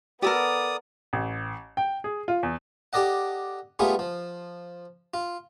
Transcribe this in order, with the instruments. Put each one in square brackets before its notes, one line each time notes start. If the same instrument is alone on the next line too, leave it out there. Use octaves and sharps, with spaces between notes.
[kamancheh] B3 [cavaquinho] G4 A4 A#4 [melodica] D5 D#6
[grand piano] A1
G5
G#4
F4
E2
[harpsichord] G4 A4 D5 D#5 F#5
G3 A3 B3 F4 G#4
F3
F4